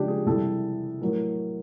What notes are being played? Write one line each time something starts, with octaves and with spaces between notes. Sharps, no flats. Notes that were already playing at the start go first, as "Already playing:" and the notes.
Already playing: C#3 F3 G#3 D4 G4
G#4
C3 E3 G3 A4
A2 F#3 A#4